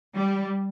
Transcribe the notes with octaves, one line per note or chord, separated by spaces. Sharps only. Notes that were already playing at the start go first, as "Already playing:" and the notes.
G3